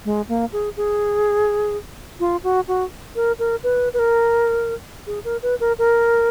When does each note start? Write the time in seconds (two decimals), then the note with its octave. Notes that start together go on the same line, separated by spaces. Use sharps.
0.05 G#3
0.29 A#3
0.52 G#4
0.77 G#4
2.20 F4
2.44 F#4
2.68 F#4
3.16 A#4
3.39 A#4
3.63 B4
3.93 B4
3.99 A#4
5.07 G#4
5.24 A#4
5.43 B4
5.60 A#4
5.78 A#4